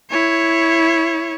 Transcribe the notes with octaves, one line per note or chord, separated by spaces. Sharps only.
E4 C#5